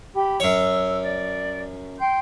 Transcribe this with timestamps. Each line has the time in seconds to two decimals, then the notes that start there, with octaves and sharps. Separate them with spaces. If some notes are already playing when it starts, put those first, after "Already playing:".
0.13 G4 B5
0.40 F#2 C#5 E6
1.02 D5
1.98 G5 C6 G6